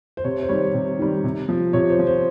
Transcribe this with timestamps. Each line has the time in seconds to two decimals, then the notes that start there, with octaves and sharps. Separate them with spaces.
0.17 C5
0.24 C3 C#5
0.43 C5
0.49 D#3 G3 C#5
0.74 C3
0.99 D#3 G3
1.24 C3
1.49 F3
1.73 C3 C#5
1.90 C5
1.99 F3
2.07 C5